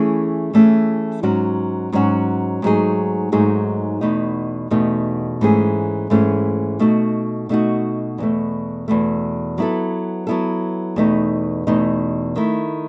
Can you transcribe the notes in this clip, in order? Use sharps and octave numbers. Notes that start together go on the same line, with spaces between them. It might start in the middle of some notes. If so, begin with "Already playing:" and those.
Already playing: E3 A3 C#4 E4 G#4
E3 A3 C#4 E4 G#4
G#2 F#3 C#4 F#4
G#2 F#3 C#4 F#4
G#2 F#3 A3 D#4 G#4
G#2 F#3 A3 D#4 G#4
E2 B2 A3 D#4
E2 B2 A3 D#4
G#2 E3 A3 C#4 G#4
G#2 E3 A3 C#4 G#4
B2 A3 D#4 F#4
B2 A3 D#4 F#4
E2 B2 A3
E2 B2 A3
F#3 B3 E4 A4
F#3 B3 E4 A4
E2 B2 A3 D#4
E2 B2 A3 D#4
D#3 A3 E4